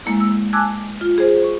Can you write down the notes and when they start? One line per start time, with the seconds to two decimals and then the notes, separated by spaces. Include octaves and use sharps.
0.06 G#3 A#3 E4
0.20 E6
0.53 G#5 A5 D6 E6 F#6 G#6
1.01 F4
1.18 G#4 C5
1.44 C#6